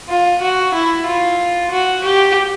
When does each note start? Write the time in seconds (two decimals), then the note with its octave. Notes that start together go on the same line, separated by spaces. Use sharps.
0.09 F4
0.41 F#4
0.74 E4
1.06 F4
1.71 F#4
2.04 G4